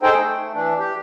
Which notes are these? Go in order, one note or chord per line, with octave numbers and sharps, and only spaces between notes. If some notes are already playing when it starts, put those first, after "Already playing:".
D#4 G#4 A4 C5 G5
A3
E3 D4
G4